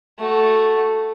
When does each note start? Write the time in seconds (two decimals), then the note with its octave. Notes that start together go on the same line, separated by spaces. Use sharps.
0.18 A3 F#4